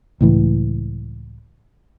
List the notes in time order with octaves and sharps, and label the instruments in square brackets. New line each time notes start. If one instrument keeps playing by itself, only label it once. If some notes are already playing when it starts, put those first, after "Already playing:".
[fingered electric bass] C#2 A2 E3